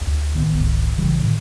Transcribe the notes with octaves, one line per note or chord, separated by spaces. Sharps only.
D2
A1 D#3 A3 B3
F1 C2 G#2 D#3
A#1 C#3 E3 G3
A2 D3 D#3